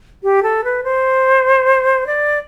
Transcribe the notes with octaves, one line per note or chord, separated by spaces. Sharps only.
G4
A4
B4
C5
D5